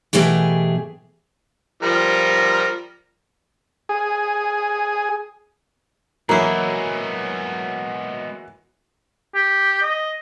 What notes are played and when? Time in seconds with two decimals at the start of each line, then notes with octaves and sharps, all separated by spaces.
0.13 B2 D#3 E3 A3 G4 G#4
1.83 F3 G3 A#4
3.89 G#4
6.29 E3 F#3 G#3 A#3 B3 E4 A#5 C7
9.35 G4
9.82 D#5